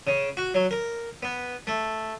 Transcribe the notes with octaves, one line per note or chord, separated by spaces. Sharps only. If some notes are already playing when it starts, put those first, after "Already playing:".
C#3
F#4
F#3
A#4
B3
A3